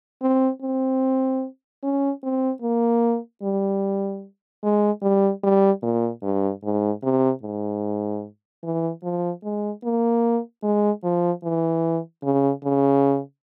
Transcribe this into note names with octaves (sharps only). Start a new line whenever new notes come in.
C4
C4
C#4
C4
A#3
G3
G#3
G3
G3
A#2
G2
G#2
C3
G#2
E3
F3
G#3
A#3
G#3
F3
E3
C#3
C#3